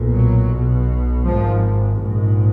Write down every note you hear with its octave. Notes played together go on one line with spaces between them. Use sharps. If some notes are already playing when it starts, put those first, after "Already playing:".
Already playing: B1 A#2
F#3
B1 B2
G#1 G#2 F3
A#1 G#2